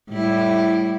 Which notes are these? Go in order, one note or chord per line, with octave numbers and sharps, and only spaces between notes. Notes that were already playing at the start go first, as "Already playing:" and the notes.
A2 G3 E4